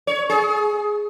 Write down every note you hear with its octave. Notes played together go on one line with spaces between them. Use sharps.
C#5
G#4